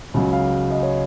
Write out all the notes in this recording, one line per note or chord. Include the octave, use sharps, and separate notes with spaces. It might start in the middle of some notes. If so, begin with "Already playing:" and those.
C#2 C#3 F#3
F5
D#5
C#5